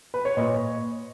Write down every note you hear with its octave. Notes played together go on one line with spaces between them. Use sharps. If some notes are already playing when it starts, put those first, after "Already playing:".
B4
C#5
A#2 D#5